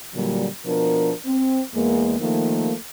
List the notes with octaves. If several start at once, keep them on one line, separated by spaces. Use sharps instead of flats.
A#2 D3 F#3 G3
B2 F3 D4 A#4
C4
E2 G#3 A#3
D#3 F3 A3 A#3